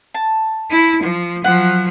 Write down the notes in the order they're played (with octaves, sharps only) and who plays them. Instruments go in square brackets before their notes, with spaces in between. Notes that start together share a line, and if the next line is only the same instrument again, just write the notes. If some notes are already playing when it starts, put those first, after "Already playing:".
[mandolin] A5
[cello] E4
F3
[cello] F3 F#3 [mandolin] F#5